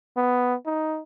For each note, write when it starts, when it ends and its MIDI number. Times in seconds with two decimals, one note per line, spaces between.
0.17 0.55 59
0.66 1.00 63